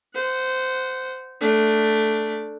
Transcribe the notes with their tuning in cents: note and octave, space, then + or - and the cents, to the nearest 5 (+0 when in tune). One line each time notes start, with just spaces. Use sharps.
C5 -15 F#5 +0
A3 +0 D4 +0